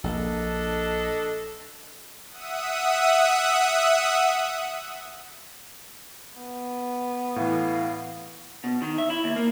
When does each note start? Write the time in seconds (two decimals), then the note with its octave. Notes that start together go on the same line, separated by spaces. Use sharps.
0.04 A#1 D4 A4 D#5
2.29 E5 F#5 D#6
6.38 B3
7.36 A2 E3 F5
8.64 B2
8.82 D#3
8.98 E5
9.10 E4
9.24 D#2
9.36 A#3